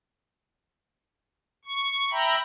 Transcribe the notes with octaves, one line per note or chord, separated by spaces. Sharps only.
C#6
E5 G5 A#5 B5